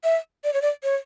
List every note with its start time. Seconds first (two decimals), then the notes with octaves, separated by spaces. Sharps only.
0.04 E5
0.44 D5
0.53 C#5
0.62 D5
0.83 C#5